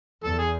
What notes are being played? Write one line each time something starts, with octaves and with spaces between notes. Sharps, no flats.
E2 A4
G#4